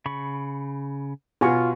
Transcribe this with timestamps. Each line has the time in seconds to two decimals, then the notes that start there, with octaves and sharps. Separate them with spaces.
0.06 C#3 B5 C#6
1.41 B2 F4 F#4 G#5 C#6